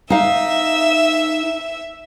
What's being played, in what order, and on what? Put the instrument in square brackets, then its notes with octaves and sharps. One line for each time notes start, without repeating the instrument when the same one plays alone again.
[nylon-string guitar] D#4 F5 [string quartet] E5